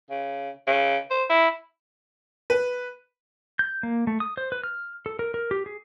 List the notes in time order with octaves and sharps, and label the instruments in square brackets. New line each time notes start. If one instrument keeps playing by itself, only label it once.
[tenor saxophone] C#3
C#3
C5
E4
[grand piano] B4
[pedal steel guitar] G6
A#3
A3
D#6
C5
B4
F6
A4
A#4
A#4
G4
G#4